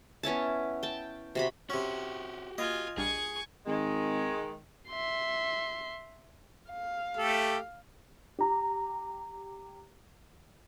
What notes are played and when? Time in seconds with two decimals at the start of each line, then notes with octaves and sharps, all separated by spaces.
0.23 B3 C#4 E4 A5
0.83 G5 A5
1.35 C3 F#4 B5
1.70 C3 C#4 F#4 G4
2.58 A#3 F4 D#5 G#5 G#6
2.97 A#1 G3 D4 G#4 G#5 C#6
3.66 G#1 D#3 G#3
4.89 E5 C6
6.70 F5
7.17 A3 G4 A4
8.39 G4 A#5